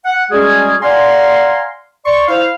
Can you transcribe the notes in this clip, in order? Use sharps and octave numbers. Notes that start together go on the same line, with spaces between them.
F#5
G3 G#3 C#4 F#4 G#4
D5 F5 F#5 G#5 A#5 C6
D5 C6 C#6
E4 C5 F5